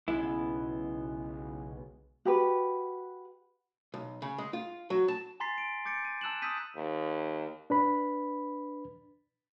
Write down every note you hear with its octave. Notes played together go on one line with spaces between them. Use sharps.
B1 C#3 G#3 B3 E4
F#4 G4 B4
B1
C#3
G#3
F4
F#3
A5
G#5 A#5 C6 A6 B6 C7
D7
D6 G6 A6 C#7 D7
D#7
A5 E6 F#6 E7 F#7
D#6 E6 G6 B6 D#7
D#2
D4 B4 B5